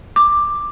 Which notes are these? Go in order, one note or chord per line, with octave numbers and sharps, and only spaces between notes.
D6